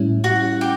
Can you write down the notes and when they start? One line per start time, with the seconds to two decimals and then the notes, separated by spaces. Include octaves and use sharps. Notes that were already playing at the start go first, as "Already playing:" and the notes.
Already playing: A2 G3 C#4 E4
0.24 F#4
0.61 G4